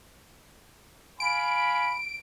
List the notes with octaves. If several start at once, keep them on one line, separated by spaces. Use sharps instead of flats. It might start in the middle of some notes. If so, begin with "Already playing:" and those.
F5 G#5 B5 D7